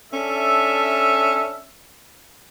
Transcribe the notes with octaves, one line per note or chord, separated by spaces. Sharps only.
C#4 D4 A4 E5